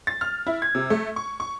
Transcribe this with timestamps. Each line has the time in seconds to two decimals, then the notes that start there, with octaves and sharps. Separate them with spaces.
0.07 A6
0.21 F6
0.47 E4
0.62 G#6
0.75 C3
0.90 A3
1.16 C#6
1.40 C#6